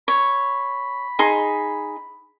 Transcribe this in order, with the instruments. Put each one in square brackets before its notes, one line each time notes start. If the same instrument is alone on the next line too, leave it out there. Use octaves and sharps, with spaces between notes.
[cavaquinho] C#5 [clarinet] B5
[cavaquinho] D#4 G#4 C6